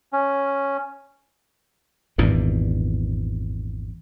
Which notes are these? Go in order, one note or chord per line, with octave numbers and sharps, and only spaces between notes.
C#4
G#1 E2 G2 A#2